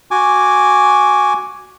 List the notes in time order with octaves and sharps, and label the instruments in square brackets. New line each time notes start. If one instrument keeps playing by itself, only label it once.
[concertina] F#4 G#5 D6